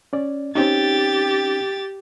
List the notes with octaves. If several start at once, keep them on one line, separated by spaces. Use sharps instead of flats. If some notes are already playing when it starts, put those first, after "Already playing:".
C#4 D5
C4 C#4 D#4 G4 A6